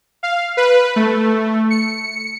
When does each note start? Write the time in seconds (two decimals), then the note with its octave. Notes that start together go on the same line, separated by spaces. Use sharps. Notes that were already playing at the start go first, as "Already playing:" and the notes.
0.23 F5
0.57 B4
0.96 A3
1.70 C#7